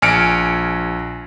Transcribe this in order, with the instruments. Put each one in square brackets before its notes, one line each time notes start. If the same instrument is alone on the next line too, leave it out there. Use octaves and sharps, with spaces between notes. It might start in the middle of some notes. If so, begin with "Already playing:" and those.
[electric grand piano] A#1 G#5 F6 C#7 D7